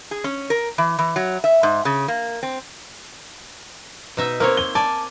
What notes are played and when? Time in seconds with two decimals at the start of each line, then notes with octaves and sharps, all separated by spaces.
0.11 G#4
0.24 C#4
0.50 A#4
0.78 E3
0.99 E3
1.16 F#3
1.44 E5
1.63 G#2
1.85 C#3
2.08 A#3
2.43 C4
4.17 B2 D#4 E5
4.40 A#3 C4 A#4 C#5
4.57 G7
4.75 D5 G#5 A5